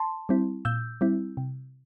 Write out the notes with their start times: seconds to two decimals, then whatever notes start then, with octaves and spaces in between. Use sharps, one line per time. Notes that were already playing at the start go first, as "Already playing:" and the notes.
Already playing: A5 C6
0.29 G3 C4 E4
0.65 A#2 E6 G6
1.01 G3 C4 E4
1.37 C3